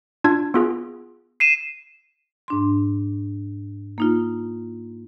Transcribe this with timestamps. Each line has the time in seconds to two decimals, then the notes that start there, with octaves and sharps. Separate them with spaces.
0.24 D4 F4 G#6
0.54 B3 F4 G#4
1.40 C7 D#7 E7
2.48 G#2 D4 C6
3.98 A#3 D#4 F4